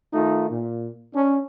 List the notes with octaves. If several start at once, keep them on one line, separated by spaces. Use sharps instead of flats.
D#3 A3 D#4 F4
A#2
C#4 D4